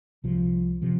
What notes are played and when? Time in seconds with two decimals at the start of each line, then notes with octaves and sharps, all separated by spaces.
0.24 C2 C3 F3
0.82 C3 F3